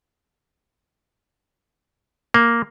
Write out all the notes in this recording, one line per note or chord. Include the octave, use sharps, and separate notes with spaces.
A#3